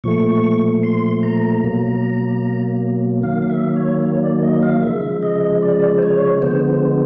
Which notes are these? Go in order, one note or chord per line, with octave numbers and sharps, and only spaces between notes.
A#2 F3 A3 C#6
C6
A#5
B2 F#3 A#3
D#3 F#3 A#3 F5
F5
E5
C#5
C#5
D5
D#5
F5
C#3 F3 G#3 E5
D#5
D5
C5
C#5
D3 F3 G#3 B3 C5
C5